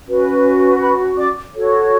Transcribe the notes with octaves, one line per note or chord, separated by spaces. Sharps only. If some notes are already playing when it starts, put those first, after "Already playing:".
C#4 F#4 B4
B4 B5
D5 D6
F#4 A4 C#5